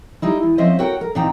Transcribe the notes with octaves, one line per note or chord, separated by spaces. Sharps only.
G3 D#4 E4
E2
F3 C4 C#4 C5 D#5 E5
F#4 A#4 C#5 F#5 G5
A#4
A#2 E3 C4 D#4 G5 A#5